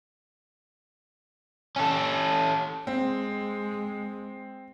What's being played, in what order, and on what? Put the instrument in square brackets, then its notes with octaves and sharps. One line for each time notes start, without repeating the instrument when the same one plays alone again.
[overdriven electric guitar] C#4 A4
[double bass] G#3 [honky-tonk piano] C4